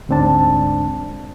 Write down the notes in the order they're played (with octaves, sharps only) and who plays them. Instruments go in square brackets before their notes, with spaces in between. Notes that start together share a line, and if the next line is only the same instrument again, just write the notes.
[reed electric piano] D2 G#2 C4 D4 A5